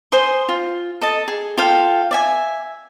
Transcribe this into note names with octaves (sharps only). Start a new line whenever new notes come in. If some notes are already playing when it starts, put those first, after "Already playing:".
C5 G#5 C6 D#6
F4
A4 D#5 A5
G#4
F4 A4 F5 G5
D5 E5 G#5